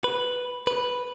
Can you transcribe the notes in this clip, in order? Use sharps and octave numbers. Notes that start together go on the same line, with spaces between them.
B4
B4